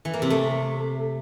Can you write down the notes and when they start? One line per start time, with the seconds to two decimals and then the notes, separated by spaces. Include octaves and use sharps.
0.05 E3
0.13 A#3
0.22 C3
0.30 A3